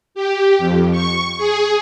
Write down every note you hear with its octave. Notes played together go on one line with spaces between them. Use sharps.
G4
F2
C#6
G#4